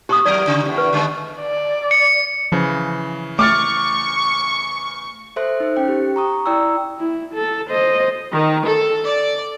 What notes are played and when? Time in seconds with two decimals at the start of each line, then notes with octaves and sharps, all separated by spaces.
0.09 A#2 G4 C#6 D#6
0.25 E2 F#3 A#4 D5
0.47 C#3 D#4
0.64 E2 A2 G4
0.78 B4
0.93 D3 G#3 B3
1.40 D5
1.91 C#7
2.52 C#3 E3 F3
3.39 A3 C#6 D6 F6 A6
5.36 A4 C5 E5 C6 F#6
5.60 D#4 C5
5.76 C#4 G5 F#6
5.88 G4
6.16 A#5 C#6 D#6
6.46 E4 D5 G5 A#5 E6
6.99 E4
7.34 A4
7.70 C5 D#5
8.34 D#3
8.65 A4
9.05 D5